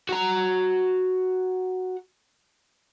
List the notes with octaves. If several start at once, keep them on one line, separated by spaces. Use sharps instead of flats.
F#4 A#5